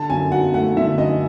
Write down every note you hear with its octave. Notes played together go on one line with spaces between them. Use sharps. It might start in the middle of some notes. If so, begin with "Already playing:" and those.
Already playing: D3 A5
F#2 G#5
F#3 F#5
A3 F#5
D3 E5
F#2 D#5